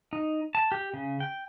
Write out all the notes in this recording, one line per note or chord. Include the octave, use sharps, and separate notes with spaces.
D#4
A5
G4
C#3
G5